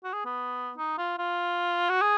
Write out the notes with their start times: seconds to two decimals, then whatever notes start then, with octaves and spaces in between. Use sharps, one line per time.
0.04 F#4
0.14 G#4
0.25 B3
0.77 D#4
0.98 F4
1.18 F4
1.90 F#4
2.02 G#4